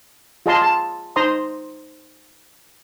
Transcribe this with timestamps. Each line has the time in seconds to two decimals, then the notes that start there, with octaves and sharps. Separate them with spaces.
0.46 F4 G#4 D#5 F5 A5 C6
0.62 A5
1.16 D#4 C5 A#5 C6 D#6